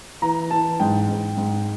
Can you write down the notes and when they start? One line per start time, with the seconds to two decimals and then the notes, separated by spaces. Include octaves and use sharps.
0.22 E3 A#5
0.50 E3 A5
0.80 G#2 G5
1.09 G#2
1.37 G#2